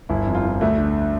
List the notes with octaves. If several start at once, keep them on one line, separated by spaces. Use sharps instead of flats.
G1 E4
F2
F4
F3
D2 A3
D3